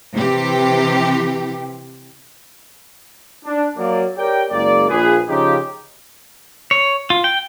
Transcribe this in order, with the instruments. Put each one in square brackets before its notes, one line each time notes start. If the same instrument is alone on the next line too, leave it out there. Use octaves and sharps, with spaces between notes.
[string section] C3 E3 G4
[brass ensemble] D4
F#3 A#3 D5
G4 A#4 C#5 D5 G5
F#1 F#2 G#3 A#3 D5
A#1 G#4 B4
C#3 F3 C#4 D#4 F4 G4
[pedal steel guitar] C#5
F4
G5